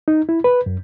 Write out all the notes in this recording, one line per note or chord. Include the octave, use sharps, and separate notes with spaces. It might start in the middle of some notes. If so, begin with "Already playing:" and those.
D#4
E4
B4
F#2